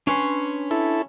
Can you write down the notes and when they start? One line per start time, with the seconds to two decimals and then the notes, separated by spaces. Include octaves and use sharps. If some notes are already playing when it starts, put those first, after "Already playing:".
0.07 C#4 D4 B4 C6
0.71 E4 A4